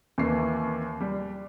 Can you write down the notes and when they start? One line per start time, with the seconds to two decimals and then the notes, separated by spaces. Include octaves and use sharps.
0.18 D#2 E3 A#3 C7
1.00 G3